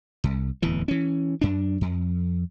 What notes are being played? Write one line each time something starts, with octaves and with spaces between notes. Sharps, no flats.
C2
D1 E2 E3
E3 C#4
F#2 D4
F2